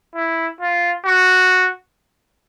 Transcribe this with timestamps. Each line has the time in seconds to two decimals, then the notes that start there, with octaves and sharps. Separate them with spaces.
0.15 E4
0.61 F4
1.06 F#4